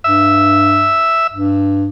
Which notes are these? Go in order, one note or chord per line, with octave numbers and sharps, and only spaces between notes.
G2 E5
G2